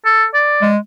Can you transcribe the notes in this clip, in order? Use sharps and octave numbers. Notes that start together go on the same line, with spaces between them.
A4
D5
G#3